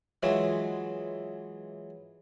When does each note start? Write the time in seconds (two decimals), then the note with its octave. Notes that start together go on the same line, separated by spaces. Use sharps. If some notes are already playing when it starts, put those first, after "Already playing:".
0.23 E3 F#3 G#3 F4 C#5 E5